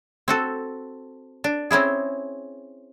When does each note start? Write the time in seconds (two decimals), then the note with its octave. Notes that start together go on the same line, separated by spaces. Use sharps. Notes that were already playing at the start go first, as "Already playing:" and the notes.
0.28 C4 F#4 A4
1.44 D4
1.71 C4 C#4 E4 G#4